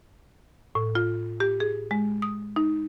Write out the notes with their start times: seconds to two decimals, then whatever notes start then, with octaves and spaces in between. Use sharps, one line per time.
0.75 A2
0.95 F4
1.40 G4
1.60 G#4
1.91 G#3
2.22 D#6
2.56 D#4